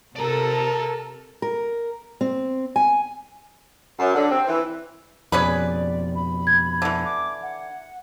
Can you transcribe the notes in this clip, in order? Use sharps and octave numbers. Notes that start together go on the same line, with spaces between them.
C3 A4 A#4 D5 A5 A#5
A#4
C4
G#5
F#2
D3
C4
E3
F2 B2 C#4 G#4 B4 D5
B5
G#6
D3 E3
D6
F#5